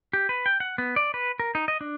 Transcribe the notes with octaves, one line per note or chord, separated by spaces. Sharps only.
G4
B4
G5
F#5
B3
D5
B4
A#4
D#4
D#5
D4